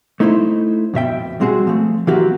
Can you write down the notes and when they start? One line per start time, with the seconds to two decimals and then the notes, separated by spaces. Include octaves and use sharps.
0.20 A3 D#4 E4 C5
0.94 F2 B2 E5 G5
1.40 G3 G#3 C4 F#4 G#4
1.67 F3 A3
2.07 E3 F#3 A#3 C4 F#4 G4